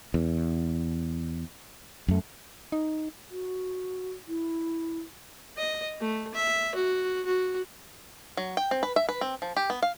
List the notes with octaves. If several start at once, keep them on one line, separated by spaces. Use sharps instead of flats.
E2
F#2 A3
D#4
F#4
E4
D#5
A3
E5
F#4
F#4
F#3
G5
C4
B4
E5
B4
C4
F3
G4
B3
F5